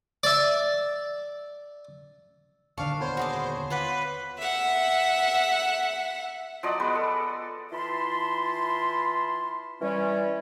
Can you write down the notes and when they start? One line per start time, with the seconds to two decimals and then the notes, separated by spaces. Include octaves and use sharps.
0.23 D5 E5
2.78 D#1 D3 D#3 D4 D5 F5 A5 C#6
3.00 B3 C5 C#5
3.17 F#4 G#4 D6
3.70 F4 B4 F#5 D6
4.38 E5 F#5
6.63 F3 F#3 D5 D#5
6.80 G#3 B3 B4
6.95 A4
7.72 E3 E4 F4 A5 B5 C6
9.81 E3 G3 C#4